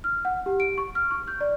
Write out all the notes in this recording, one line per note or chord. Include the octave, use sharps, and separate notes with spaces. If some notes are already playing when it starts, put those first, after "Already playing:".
F6
F#5
G4
D7
C#6
F6
C#6
G6
D5